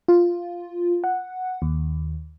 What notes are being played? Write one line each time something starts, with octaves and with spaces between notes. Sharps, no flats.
F4
F#5
D#2